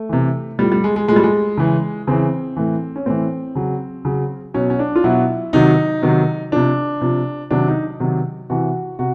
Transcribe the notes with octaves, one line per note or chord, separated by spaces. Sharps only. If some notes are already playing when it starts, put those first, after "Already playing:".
Already playing: A3
C3 E3
A2 F3 G3
G3
G#3
G#3
A2 F3 G#3
G3
G#3
C#3 E3
C#3 E3 C4
A2 E3
C#4
A2 E3 C4
C#3 F#3
C#3 F#3
B2 F#3 C#4
C#4
D4
F4
B2 F#3 E4
C3 D#3 F#3 D#4
C3 D#3 F#3
C3 F3 D4
C3 F3
C3 D#3 F#3 D4
D#4
C3 D#3 F#3
C3 E3 F#4
C3 F#4